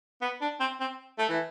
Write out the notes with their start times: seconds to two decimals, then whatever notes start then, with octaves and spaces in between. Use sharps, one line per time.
0.22 B3
0.41 D4
0.60 C4
0.80 C4
1.19 A3
1.29 E3